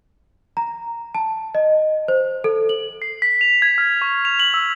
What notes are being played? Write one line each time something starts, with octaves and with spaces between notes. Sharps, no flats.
A#5
A5
D#5
C5
A4
F#7
C7
B6
F7
G#6
F6
C#6
F7
F#7
E6